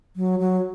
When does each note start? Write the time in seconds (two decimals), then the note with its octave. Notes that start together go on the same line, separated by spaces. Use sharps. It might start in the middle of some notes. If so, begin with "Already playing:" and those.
0.16 F#3
0.39 F#3